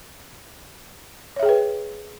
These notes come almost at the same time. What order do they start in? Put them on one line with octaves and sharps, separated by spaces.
C#5 E5 G#4 G5 B4